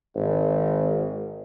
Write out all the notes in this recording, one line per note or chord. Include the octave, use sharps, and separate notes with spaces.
G#1